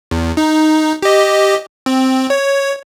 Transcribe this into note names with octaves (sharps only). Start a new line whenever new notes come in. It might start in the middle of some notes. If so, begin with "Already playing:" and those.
E2
D#4
G4 D#5
C4
C#5